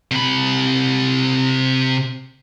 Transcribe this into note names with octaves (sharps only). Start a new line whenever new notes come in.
C3 B5